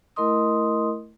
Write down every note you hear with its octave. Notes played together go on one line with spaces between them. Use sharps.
A3 E4 A#4 D#5 C6 D#6